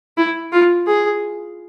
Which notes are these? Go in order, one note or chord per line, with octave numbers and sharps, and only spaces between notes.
E4
F4
G#4